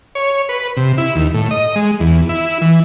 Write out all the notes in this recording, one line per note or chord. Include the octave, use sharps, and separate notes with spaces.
C#5
B4
C3
E4
D#2
A2
D#5
G#3
E2
E4
E3